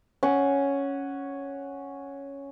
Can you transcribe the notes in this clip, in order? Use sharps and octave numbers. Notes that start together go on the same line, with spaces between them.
C#4 F#5